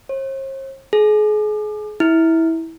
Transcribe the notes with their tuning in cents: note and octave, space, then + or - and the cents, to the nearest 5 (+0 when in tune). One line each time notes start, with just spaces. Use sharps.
C5 +45
G#4 +35
E4 -15